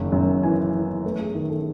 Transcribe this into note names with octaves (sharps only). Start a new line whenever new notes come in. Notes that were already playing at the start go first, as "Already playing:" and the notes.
Already playing: F#1 D#3
F#2
E3 G#5
E3
A3 B4
G#4
D#3 G#4
A4